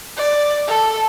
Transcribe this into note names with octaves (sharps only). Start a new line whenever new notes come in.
D5
A4